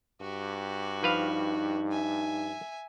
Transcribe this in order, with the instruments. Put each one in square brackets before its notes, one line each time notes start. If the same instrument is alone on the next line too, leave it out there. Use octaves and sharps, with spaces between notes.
[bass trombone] G2 [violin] F#4 G4
[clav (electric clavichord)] F3 B4 F5 [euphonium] D#4
[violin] E5 G#5